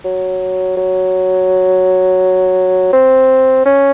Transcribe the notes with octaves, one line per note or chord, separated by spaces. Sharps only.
F#3
F#3
C4
C#4